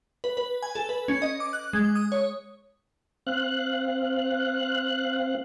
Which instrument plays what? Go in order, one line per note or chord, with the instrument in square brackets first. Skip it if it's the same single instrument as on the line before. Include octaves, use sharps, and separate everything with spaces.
[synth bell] B4
B4
G#5
A4
B4
C#4
D#5
D6
F#6
G#3
D#6
C#5
[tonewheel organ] C4 F5 F#6